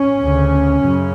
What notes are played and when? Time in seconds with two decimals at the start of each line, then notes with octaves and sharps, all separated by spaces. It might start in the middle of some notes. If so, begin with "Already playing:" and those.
Already playing: C#4
0.21 D2 C#3
0.81 F#2 C#3